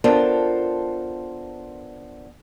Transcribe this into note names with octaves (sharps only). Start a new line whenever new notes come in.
B3 D4 F4 A4 A#4 C5